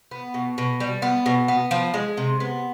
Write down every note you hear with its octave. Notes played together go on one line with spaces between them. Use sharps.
B3
B2
B2
G3
B3
B2
B3
F3
G#3
C3
B3